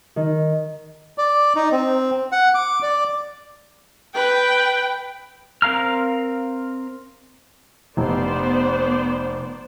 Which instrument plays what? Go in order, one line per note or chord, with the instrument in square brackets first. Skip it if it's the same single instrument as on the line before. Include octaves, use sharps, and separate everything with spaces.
[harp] D#3
[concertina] D5
D#4
C4
F#5
D6
D5
[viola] B4 [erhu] G5
[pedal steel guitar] C4 A#4 F5 A#5 F6
[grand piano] F1 [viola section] B3 C5 D5